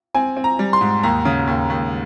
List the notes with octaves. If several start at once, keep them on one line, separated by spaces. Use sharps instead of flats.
C4 G#5
C4
A#5
G3
C6
G#2
D#2 A#5
C#3
D#2
D#2